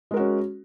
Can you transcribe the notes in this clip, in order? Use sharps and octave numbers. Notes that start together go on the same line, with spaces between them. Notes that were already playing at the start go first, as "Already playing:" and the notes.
G#3 C#4 F#4 A#4